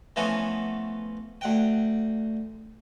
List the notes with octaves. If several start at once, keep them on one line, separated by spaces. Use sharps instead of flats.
E3 F3 A3 B3 C#4 F#4
D2 F#5 G5